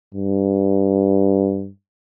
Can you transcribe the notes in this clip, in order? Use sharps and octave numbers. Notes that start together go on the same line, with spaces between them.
G2